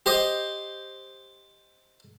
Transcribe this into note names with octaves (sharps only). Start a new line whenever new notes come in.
G4 C5 D#5